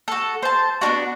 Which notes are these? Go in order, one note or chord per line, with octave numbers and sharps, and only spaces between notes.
F#4 A4
C5 A5
B3 C#4 D4 F#4